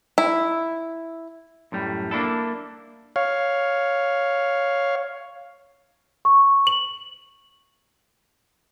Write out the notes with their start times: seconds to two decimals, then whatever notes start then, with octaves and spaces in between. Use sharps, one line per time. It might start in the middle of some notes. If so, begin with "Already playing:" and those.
0.18 E4
1.72 F#2 A2 G3
2.11 A#3 D4 E4 A4
3.16 C#5 F5
6.25 C#6
6.67 F#7